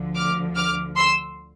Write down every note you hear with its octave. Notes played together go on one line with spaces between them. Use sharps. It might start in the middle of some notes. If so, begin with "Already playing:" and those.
Already playing: D2 D3 F3
D6 F6
D6 F6
C6 E6